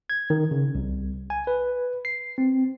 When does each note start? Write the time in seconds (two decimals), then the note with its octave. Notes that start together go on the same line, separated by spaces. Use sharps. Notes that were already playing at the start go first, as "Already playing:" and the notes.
0.10 G#6
0.30 D#3
0.51 C#3
0.75 C2
1.30 G#5
1.47 B4
2.05 C7
2.38 C4